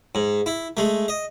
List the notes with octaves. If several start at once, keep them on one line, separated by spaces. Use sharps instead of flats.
G#2
E4
G#3 A3
D#5